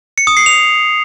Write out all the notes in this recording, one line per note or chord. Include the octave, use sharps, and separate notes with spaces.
C#7
D#6
C7
F7